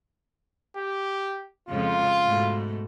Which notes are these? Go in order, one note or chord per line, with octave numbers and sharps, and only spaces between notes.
G4
F2 C#3 G#3 F4
G#2 B2 A3